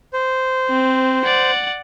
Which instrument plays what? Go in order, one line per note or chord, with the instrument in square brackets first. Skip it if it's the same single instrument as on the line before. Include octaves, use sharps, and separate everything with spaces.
[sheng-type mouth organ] C5
[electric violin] C4
D5 F#5